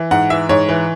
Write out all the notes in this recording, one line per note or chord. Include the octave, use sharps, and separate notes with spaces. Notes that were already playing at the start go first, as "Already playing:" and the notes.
Already playing: E3
G#2 F#5
E3 E5
G#2 C#5
E3